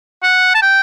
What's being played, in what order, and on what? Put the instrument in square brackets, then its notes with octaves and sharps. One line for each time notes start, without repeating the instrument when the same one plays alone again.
[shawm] F#5
A5
G5